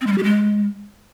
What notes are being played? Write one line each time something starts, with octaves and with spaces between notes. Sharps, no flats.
C4
G#3
G3
G4
G#3